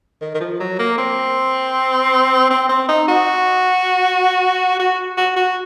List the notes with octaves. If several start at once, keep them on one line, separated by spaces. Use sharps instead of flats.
D#3
D#3
F3
F#3
A#3
C4
C4
C4
D#4
F#4
F#4
F#4
F#4